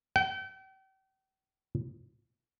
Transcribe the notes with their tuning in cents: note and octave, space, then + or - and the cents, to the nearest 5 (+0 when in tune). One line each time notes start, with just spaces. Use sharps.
G5 -40